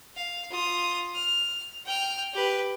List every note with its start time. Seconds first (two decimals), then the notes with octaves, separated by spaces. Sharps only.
0.16 F5
0.51 F4 D#6
1.14 F6
1.85 G5 F6
2.34 G4 B4